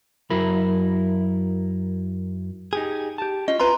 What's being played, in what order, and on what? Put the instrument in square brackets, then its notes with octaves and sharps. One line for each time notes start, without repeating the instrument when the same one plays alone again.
[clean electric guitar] F#2 F#3 E4 A#4 B5
D#4 G4 G#4
G4 A5
[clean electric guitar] C#4 F4 [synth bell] D#5
[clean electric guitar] C4 E4 F4 [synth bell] B4 A#5 C6